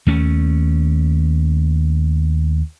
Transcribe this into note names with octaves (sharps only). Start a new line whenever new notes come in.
D#2 A3 C#4